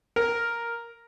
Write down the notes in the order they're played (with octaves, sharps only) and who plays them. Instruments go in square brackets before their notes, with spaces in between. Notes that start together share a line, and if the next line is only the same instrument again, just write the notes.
[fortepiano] A#4